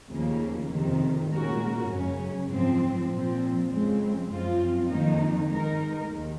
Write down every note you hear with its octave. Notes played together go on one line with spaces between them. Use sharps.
D#2 C#3 F3 A#3
F2 C3 D#3
A#2 G#3 C#4 F#4 A#4
F#2 C#3 F#3 C#4
G#2 F3 C4
A#2 F3 C4
F2 C#3 G#3 C4
F#2 F3 C4 F4
F2 D#3 A#3 D#4
D#3 G#3 D#4 A#4
D#2 D#3